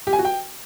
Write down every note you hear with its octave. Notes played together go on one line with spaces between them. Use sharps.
G4
G#5
F#4
G5